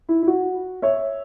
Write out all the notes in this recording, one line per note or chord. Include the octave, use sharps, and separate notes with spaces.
E4
E4
F#4
C#5 E5